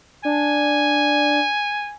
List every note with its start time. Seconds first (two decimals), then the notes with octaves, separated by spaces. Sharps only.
0.25 D4 G#5